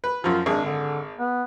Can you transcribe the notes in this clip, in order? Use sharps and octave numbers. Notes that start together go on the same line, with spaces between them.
B4
F#2 F3 F4
G#1 D4 G#4
D3
B3